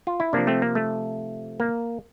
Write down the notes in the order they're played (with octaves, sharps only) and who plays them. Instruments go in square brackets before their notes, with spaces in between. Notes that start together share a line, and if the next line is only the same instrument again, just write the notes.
[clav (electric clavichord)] F4
E4
C3 F3 A#3 D4
A3 C4
A#3
A3
A#3